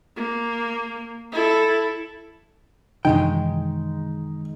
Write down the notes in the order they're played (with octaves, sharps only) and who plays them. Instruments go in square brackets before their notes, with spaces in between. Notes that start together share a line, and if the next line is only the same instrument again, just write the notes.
[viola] A#3
E4 A4
[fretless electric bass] F#2 C3 E3 [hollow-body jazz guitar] D#3 G#3 G5 [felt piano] D#4